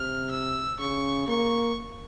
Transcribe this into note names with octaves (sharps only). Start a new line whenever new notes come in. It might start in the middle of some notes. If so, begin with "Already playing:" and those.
Already playing: C3 F6
E6
C#3 C#6
A#3 C#6